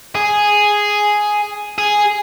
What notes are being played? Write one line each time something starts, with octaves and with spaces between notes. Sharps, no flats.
G#4
G#4